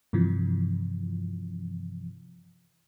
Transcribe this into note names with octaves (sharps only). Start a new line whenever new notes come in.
G2 C3 E3 F3